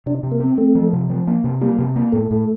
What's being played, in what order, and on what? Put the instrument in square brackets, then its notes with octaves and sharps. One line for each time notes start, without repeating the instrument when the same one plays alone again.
[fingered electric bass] C3 [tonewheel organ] D4
[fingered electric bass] C3
[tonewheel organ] A#3
[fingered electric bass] C4
[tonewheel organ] A3 [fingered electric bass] C4
[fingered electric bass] F3
C3
F3
A#3
C3
[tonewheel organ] G3 [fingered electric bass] A#3
[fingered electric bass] C3
A#3
[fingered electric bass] A2 [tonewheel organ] A3
[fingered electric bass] A2